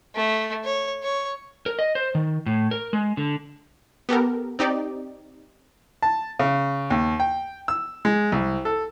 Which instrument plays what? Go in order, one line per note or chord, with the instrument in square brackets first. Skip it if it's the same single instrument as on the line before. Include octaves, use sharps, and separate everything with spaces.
[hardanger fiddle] A3
C#5
C#5
[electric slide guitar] A#4
D#5
C5
D#3
A2
A#4
G#3
D3
[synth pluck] B3 G4 A4 A#4
C4 D#4 G4 D5
[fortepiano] A5
C#3
D#2
G5
E6
G#3
C2
A4